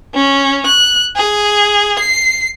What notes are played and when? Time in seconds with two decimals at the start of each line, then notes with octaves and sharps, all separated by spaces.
0.14 C#4
0.66 F#6
1.16 G#4
1.99 C7